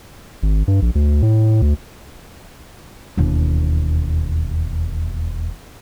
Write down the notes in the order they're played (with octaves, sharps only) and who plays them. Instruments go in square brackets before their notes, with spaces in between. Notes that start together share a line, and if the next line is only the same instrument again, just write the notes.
[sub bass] G#1
G2
A#1
D2
A2
D2
[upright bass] E1 D#2